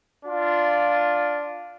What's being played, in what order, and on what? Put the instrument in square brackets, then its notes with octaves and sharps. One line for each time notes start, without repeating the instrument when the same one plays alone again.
[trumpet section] D4 F4